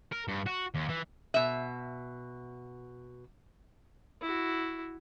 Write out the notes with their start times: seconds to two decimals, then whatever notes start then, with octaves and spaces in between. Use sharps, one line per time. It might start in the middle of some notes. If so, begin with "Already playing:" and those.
0.13 A#4
0.28 G2
0.46 F#4
0.74 D#2
0.89 E3
1.34 B2 E5
4.21 E4 F#4